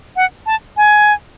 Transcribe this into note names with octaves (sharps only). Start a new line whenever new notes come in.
F#5
A5
G#5